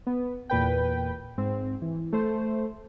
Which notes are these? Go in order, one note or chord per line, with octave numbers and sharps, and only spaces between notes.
B3
E2 A#2 B4 G5
G#2 C4
E3
A3 C5